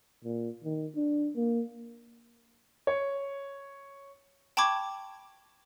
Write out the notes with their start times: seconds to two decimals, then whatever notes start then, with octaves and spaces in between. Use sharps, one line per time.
0.24 A#2
0.64 D#3
0.95 D4
1.36 A#3
2.87 C#5
4.57 G5 A5 B5 C#6 D6 G#6